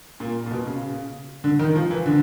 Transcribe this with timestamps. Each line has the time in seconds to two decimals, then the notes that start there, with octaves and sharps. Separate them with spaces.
0.20 A#2
0.46 A#2
0.51 B2
0.66 C#3
1.44 D3
1.59 D#3
1.76 F3
1.91 E3
2.06 D3